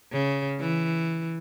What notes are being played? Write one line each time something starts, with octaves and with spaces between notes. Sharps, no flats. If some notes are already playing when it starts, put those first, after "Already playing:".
C#3
E3